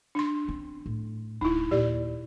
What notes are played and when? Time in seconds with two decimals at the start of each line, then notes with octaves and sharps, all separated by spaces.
0.15 D4 C6
0.48 C4 C#4
0.86 A2
1.41 D1 D#4 E4
1.71 D#2 A#2 G4 D5